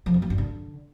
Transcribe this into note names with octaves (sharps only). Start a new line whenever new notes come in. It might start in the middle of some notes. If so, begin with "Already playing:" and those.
F3
F2
A#3
G2
D3